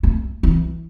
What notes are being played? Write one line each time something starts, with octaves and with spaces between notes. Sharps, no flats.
A3
E3